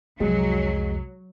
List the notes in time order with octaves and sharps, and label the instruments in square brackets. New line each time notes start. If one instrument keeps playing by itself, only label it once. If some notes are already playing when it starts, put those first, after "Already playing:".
[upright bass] C2 F2 [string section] F#3 [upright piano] G#3